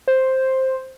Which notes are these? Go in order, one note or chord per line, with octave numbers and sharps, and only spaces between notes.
C5